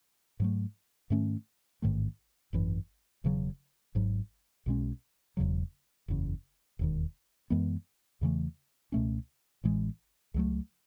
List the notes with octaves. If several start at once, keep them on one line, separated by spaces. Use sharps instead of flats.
G#2 F#3 A3
G#2 D#3 A3 C#4
A1 G#2 D#3 A3
G#1 F#2 E3
E1 E2 C#3 F#3
G#1 G#2 F#3
B1 B2 G#3 C#4
E1 E2 C#3 F#3
F#1 E2 C#3
E1 D#2 D#3
F#2 E3 G#3 B3
E2 C#3 E3 A3
C#2 B2 A3 C#4
A1 A2 E3 G#3
C#2 C#3 F#3 A3